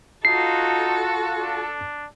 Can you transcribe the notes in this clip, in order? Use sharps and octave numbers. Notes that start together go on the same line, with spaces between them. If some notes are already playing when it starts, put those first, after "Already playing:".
D#4 F4 F#4 A4 C7
D4